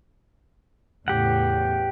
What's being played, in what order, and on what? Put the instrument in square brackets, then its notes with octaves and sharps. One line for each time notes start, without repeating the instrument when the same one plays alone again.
[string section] E2 A2 C#3 [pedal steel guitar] G4 F#5